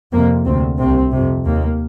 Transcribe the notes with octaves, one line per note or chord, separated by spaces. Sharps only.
F2 C3 A#3
D2 C4
C3
C2 C3 C4
F2 C3
D#2 A#3